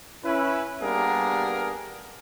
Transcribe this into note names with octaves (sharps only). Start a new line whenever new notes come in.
C#4 E4 B4
G3 A#3 B3 D4 G#4 A#4